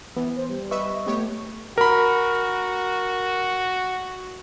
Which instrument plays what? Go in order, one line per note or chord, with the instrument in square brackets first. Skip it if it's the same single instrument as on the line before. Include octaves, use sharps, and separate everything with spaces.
[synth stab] E3 [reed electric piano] B3
[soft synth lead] C5
G3
[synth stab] B4 E5 [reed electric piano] D#5 C#6
[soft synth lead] A3 [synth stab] B3 G4 C#5
[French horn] F#4 [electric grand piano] A#4 B5